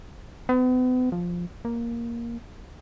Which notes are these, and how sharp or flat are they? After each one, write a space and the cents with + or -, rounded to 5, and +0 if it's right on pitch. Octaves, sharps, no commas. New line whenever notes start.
B3 +40
F3 +5
A#3 +5